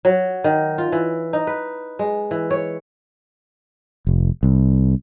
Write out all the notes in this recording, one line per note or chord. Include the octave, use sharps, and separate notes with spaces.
F#3
D#3
F4
E3
D#4
B4
G#3
E3
C#5
F1
C2